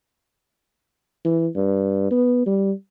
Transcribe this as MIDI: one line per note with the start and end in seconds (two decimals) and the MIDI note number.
1.25 1.47 52
1.55 2.11 43
2.11 2.42 59
2.46 2.72 55